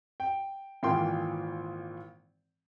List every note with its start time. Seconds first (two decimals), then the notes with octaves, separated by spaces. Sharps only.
0.20 G5
0.83 G#1 A#2 E3 A#4 G5 C6